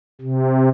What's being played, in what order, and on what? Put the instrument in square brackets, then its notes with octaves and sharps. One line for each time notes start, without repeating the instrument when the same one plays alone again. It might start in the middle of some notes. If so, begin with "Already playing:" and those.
[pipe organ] C3